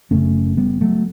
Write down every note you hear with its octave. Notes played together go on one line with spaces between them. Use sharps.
F#1 F#2 C#3 A3 C#4
G3 B3
F#3 A3